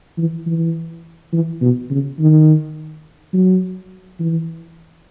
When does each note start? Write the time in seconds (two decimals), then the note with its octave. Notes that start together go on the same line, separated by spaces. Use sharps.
0.18 E3
0.46 E3
1.33 E3
1.62 B2
1.90 C#3
2.19 D#3
3.34 F#3
4.20 E3